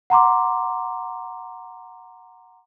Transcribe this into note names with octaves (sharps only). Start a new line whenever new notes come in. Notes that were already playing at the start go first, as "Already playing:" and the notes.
F#5 A#5 C6 D6